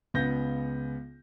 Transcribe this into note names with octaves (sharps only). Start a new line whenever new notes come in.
C#2 C#3 B3 G6 A#6